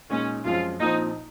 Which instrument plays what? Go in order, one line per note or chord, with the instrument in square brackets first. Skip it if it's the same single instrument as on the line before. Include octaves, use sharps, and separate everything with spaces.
[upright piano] A#2 G#3 D#4 [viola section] C#4
[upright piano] F#2 F3 G#3 C4 [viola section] F4
[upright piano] A#1 A#2 F3 C4 F4 [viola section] D#4